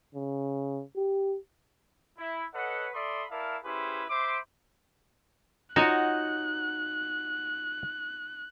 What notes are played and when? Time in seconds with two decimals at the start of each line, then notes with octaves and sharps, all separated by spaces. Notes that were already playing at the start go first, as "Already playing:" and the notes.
0.14 C#3
0.96 G4
2.18 E4
2.54 A4 B4 C#5 D#5 F#5
2.94 A4 D5 E5 B5 C6 D#6
3.31 E4 A#4 D5 E5 F5 A5
3.64 C#4 E4 G4 G#4 B4 C5
4.10 C5 E5 B5 C6 D6
5.76 D#4 F4 F#4 C#5 F#5 G#5 F#6